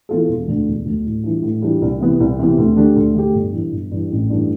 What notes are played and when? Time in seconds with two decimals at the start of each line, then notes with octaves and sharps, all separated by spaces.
0.09 E3 B3 F4 A4
0.28 E1
0.48 D2 D3
0.67 E1
0.85 D2 D3
1.06 A2
1.24 E3 G3 D4 F4
1.43 A2
1.62 E3 G3 D4 F4
1.82 C2
2.00 C3 E3 B3
2.20 C2
2.39 C3 E3 B3
2.58 D2
2.77 D3 A3 D4 G4
2.96 D2
3.15 D3 A3 D4 G4
3.34 G1
3.53 G2 E3
3.72 G1
3.91 G2 E3
4.11 A1
4.30 G2 E3 A3 D4